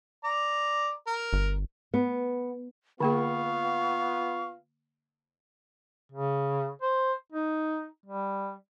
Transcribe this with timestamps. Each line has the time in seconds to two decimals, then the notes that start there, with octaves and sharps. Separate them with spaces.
0.24 D5 A#5
1.07 A#4
1.33 G1
1.94 B3
3.01 D3 A#3 B3 F4 G#4 F5 C#6
6.12 C#3
6.82 C5
7.32 D#4
8.06 G3